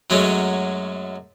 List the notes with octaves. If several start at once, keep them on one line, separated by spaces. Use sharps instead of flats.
F#2 F#3 G#3 A3 C#4